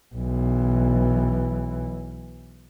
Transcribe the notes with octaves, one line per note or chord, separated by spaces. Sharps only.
B1 E3